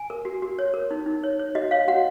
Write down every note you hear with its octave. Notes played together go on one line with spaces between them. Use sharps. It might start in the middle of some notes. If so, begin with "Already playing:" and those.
Already playing: G#5
A#4
F#4
F#4
C#5
A#4
D#4
D#4
C#5
C#5
F#4 D#5
C#5 F5
F#4 F#5